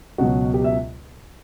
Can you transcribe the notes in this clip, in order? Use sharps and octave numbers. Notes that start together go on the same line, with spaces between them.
C#2 B2 F#3 F#4
G4
E5